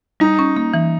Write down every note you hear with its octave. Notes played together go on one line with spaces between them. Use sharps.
G3 D#4
C#4
A#3
E3